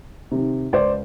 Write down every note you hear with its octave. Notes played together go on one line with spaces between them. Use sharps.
C3 D#3
C#2 C5 D5